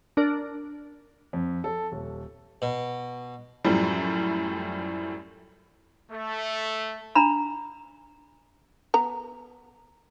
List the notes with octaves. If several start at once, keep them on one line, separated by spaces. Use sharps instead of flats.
D4 A#4 D5
F2
A4
D#1
B2
F#2 A2 F3 G3
A3
D4 A#5 B5
B3 A#5